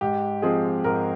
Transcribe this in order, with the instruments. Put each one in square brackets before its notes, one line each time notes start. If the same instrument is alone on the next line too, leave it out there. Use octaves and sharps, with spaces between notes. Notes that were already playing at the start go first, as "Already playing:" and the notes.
[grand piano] G#2 G4
F3 G#3 C4 G#4
G#2 A#4